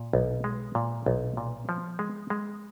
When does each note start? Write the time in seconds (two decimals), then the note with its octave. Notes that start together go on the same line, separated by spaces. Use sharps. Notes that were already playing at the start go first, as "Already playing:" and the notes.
Already playing: A#2
0.13 B1
0.44 G#3
0.75 A#2
1.06 B1
1.37 A#2
1.69 F3
1.99 G#3
2.30 G#3